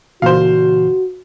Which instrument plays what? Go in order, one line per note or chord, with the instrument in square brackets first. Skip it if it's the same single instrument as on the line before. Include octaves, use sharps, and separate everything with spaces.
[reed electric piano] A#2 C#3 E3 [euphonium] F#4 [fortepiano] C5 F5